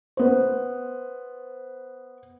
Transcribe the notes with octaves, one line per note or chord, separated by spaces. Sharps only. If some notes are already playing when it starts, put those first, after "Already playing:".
B3 C5